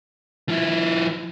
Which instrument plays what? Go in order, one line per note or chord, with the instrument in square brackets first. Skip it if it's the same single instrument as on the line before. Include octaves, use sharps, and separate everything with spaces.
[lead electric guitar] F3 E4